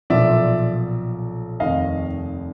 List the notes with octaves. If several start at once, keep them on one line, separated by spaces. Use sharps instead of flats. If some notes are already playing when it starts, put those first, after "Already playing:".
B1 A#2 F3 D5 E5
F1 D#2 D#3 D#5 F5